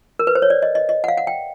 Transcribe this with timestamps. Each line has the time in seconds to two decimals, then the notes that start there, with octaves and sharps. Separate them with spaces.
0.19 A#4
0.27 B4
0.35 C5
0.42 C#5
0.50 D5
0.62 D#5
0.75 D#5
0.89 D#5
1.04 F#5
1.08 F5
1.17 F#5
1.27 G5